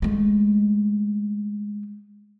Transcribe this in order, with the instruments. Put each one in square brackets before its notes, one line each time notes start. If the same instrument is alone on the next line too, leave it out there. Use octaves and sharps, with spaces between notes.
[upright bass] G#3 A3